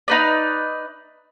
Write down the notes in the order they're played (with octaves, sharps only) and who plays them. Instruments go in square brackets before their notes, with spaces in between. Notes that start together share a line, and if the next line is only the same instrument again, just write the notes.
[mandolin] D#4 B4 D5